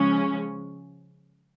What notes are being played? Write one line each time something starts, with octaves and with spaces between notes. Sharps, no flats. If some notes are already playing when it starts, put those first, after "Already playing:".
Already playing: C#3 F3 G#3 C#4